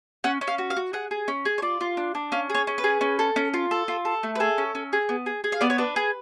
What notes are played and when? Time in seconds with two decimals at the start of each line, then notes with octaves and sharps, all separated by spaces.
0.24 C#4 F#5
0.41 C#4
0.47 F5
0.58 F#4
0.70 F5
0.77 F#4
0.93 G#4 F#5
1.11 G#4
1.28 C#4
1.45 G#4
1.58 C#5
1.62 F4 D5
1.81 F4
1.97 D4
2.15 D4
2.32 C#4 F5
2.50 G#4 C#5
2.67 C#4
2.78 B4
2.84 G#4
3.01 C#4
3.19 A4
3.36 C#4
3.54 F4
3.71 A4
3.88 F4
4.05 A4
4.23 A3
4.35 B4
4.40 G#4 A4
4.58 C#4
4.75 C#4
4.93 G#4
5.09 B3
5.26 G#4
5.44 G#4
5.52 F5
5.61 B3 D5
5.70 C#5
5.78 D4 B4
5.96 G#4